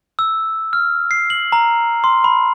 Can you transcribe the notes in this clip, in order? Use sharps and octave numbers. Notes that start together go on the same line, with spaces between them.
E6
F6
C7
F#7
A#5
C6
B5